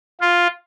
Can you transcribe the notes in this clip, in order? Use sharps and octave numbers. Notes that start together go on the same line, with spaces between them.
F4